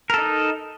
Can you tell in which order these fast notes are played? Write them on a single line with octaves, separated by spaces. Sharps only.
A#4 A4 D#4